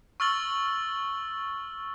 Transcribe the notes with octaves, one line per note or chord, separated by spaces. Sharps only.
C#6 E6 F6 A6 F#7 G7